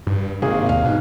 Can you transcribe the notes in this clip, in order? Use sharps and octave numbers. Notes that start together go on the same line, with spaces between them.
G2
G#1 C3 A#3 G#4
D#2 F5
G#2 B2